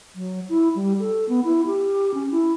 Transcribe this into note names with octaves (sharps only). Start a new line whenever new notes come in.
F#3
E4
G3
A4
B3
E4
G4
C#4
E4